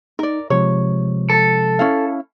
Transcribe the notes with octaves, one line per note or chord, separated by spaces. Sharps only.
D#4 A#4 D5
C3 F3 G#3 C#5
A4
C#4 E4 F5